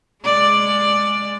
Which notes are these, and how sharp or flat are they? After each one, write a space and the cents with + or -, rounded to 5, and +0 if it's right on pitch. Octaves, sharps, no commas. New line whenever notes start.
G#3 +0 D5 +5